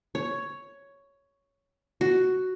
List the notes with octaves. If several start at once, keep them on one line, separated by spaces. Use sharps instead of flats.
C#5
F#4